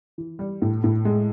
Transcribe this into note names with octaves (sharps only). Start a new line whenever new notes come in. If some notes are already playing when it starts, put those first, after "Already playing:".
E3
G3
A2
A2
G#3